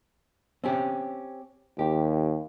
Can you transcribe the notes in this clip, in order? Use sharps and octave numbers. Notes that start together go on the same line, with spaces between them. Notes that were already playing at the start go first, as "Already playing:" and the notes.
C4 C#4 G4
D#2 G4